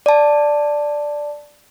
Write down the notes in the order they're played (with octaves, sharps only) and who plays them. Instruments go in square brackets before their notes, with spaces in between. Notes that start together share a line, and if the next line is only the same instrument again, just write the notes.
[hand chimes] D5 A5